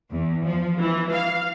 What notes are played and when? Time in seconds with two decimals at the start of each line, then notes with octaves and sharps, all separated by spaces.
0.11 E2
0.45 F3
0.79 E3
1.12 F5